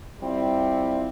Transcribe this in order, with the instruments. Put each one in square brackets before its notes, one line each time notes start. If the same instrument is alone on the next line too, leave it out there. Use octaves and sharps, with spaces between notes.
[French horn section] G3 C4 E4 F4